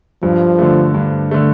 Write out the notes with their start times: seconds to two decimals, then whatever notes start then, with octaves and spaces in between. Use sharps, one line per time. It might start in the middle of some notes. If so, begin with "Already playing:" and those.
0.23 G2 F3
0.59 D3 A3
0.95 G2
1.31 D3 A3